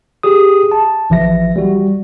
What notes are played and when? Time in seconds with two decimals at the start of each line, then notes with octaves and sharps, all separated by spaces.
0.23 G4 G#4 D#6
0.72 A5
1.10 A1 E3 F3 E5 A#6
1.56 G3 F#4